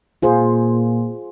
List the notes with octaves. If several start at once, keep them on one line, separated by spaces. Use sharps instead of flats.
A#2 F4 G#4 C5